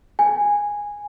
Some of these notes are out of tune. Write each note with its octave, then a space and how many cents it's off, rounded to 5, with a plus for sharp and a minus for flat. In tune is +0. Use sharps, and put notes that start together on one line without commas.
G#5 -10